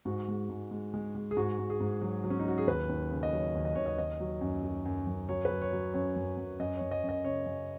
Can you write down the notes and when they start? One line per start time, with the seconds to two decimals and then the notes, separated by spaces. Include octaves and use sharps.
0.05 G#2 F#4
0.28 G#3
0.49 G#2
0.71 G#3
0.94 G#3
1.15 G#3
1.31 G#4
1.37 G#2 F#4
1.59 G#2
1.70 G#4
1.80 G#2
2.01 F#3
2.24 F#3
2.30 C#4
2.39 D#4
2.45 F#3 F#4
2.58 G#4
2.67 D#2 B4
2.89 D#2
3.11 C#3
3.23 D#5
3.33 F#3 C#5
3.55 D#2
3.65 D#5
3.75 D#2 C#5
3.86 D#5
3.98 D#3 D#5
4.20 F#3
4.41 F#2
4.63 F#3
4.85 F#2
5.07 F#2
5.29 F#3 C#5
5.45 B4
5.51 F#3
5.62 C#5
5.72 F#3
5.94 F#2 C#5
6.16 F#2
6.37 F#2
6.59 F#2 D#5
6.76 C#5
6.81 F#2
6.91 D#5
7.03 F#2
7.09 D#5
7.25 C#3 C#5
7.46 F#2